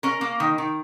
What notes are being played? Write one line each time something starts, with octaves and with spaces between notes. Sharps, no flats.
C#4 A#4
A#3
D#3
D#3